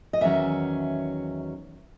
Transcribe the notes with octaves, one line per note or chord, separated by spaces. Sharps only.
D#5
E2 D#3 F#3 C#4 E5